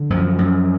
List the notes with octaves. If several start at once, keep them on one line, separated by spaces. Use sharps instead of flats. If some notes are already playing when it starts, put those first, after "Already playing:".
Already playing: D3
F#2 F3
F#2